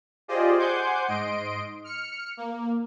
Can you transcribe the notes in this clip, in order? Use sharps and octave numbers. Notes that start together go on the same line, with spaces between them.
F4 G4 G#4 C5 D5 D#5
C5 F#5 G#5 C6 D6 G6
G#2 D#5 C6 D7
F6 C#7
A#3